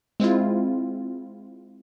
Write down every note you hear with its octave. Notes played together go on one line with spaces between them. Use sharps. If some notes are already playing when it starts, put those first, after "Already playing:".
G#3 C4 E4 F4